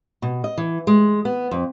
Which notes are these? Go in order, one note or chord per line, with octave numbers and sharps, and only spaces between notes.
B2
D#5
E3
G#3
B3
F2